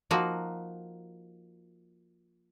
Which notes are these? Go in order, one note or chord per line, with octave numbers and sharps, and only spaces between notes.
F3 A#3 D#4 F#4